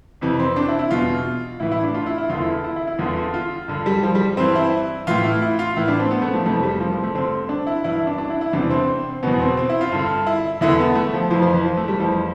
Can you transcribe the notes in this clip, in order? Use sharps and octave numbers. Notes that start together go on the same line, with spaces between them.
F2 C3 E3
C4
D4
E4
E4
E2 B2 F4
A2 E3 E4
E4
D4
F4
E4
E4
E2 D3 F4
E4
E4
E4
E4
E2 D3 F4
F4
F4
G2 D3
G3
F3
G3
G2 E3 C4
E4
A2 E3 F4
E4
E4
F4
A2 E3 E4
D4
C4
B3
A3
F3
F2 C3 E3 A3
G3
F3
F3
A3
G2 D3 C4
D4
E4
G2 E3 E4
E4
D4
D4
E4
E4
E2 C3 E3 D4
C4
E2 B2 B3
C4
C4
E4
F4
G2 D3
E4
E2 D3 E4
B3
A3
F3
F2 E3 F3
F3
E3
F3
A3
G3
F2 E3 F3